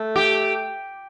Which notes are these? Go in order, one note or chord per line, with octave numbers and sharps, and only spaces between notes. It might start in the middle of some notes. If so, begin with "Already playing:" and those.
Already playing: A3
G4